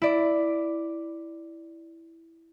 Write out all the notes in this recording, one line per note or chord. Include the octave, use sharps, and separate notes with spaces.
E4 D5